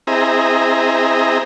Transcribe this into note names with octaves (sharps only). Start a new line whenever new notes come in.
C4 E4 G#4 D#5 A#5